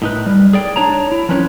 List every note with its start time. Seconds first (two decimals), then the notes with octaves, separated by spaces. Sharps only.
0.02 A2 D#4 B4
0.26 G3
0.53 G#4 D5 G5
0.76 D4 D#4 C#5 A5 A#5
1.12 E4
1.29 F3 C4 C#4 B4 C#5